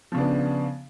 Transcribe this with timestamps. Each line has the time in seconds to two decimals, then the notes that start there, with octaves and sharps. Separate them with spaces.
0.12 F3
0.14 C#3
0.17 D4
0.20 B3